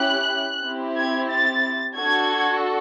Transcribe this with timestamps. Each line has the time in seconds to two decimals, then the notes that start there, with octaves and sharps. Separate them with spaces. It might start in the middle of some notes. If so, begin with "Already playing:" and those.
Already playing: C#4 E4 G4 F#6
0.65 C4 E4 G4
0.99 G#6
1.31 A6
1.97 D4 F#4 A4 G#6